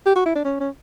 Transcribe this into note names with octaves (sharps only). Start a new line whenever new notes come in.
G4
F#4
E4
D4
C#4
C#4